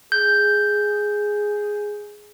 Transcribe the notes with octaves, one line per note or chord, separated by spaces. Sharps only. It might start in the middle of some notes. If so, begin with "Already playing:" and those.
G#4 G6